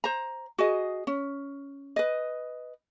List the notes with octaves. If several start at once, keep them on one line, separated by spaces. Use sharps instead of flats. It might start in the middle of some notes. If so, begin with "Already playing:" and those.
C5 A#5
F#4 G#4 D#5
C#4
B4 D#5